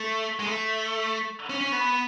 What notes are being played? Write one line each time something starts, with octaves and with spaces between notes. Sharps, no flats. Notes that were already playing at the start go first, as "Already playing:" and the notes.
Already playing: A3
G#3
A3
C#4
C#4
B3